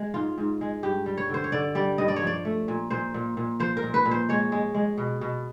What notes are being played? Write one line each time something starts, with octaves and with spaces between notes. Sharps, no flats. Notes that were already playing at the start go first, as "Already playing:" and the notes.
Already playing: G#3
G#2 F4
G#2
G#3
G2 G4
G3
C#5
D3 C5
C#5
D3 D5
G3 D5
G2 D#5
D5
C#5
F3
D5
A3
A#2
A#2 C5
A#2
A#2
F3 C5
A#4
A#2
B4
A#2
C5
G#3 C#5
G#3
G#3
B2
B2